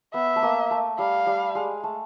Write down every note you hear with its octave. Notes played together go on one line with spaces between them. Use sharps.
B3 E5
A3
A#3
A3
G3 F5
G3
G#3
A3